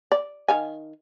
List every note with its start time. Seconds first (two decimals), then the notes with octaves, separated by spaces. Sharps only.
0.12 D5
0.48 D#3 F5 G#5